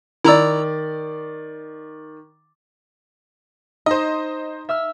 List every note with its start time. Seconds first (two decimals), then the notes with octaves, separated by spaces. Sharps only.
0.25 D#3 E4 D5 A#5 E6
3.86 D#4 C5 D#5
4.69 E5 E6 F6